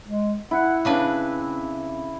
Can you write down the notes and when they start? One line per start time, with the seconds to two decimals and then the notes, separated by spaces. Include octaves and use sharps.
0.06 G#3
0.51 E4 F#5
0.85 C#3 C4 D4 B4